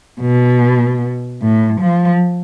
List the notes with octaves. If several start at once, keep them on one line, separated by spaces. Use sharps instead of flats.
B2
A2
F3